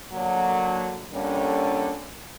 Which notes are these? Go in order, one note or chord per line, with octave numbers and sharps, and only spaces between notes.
D3 F#3 A#3
F2 D3 G3 A#3 C#4